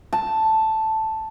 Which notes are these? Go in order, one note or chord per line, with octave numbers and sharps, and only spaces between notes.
A5